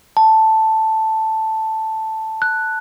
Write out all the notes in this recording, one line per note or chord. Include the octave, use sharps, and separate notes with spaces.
A5
F#6